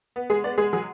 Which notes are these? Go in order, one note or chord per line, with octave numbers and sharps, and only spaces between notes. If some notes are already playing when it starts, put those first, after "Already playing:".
B3
G#3 G#4
B3 D5
G#3 G#4
F#3 G#4